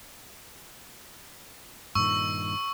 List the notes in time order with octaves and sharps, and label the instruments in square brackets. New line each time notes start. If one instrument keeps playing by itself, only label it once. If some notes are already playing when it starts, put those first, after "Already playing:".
[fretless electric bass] G2 A#2 D#3 [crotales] C#6 E6